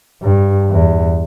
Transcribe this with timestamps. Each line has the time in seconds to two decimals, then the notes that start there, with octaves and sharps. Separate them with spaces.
0.22 G2
0.70 E2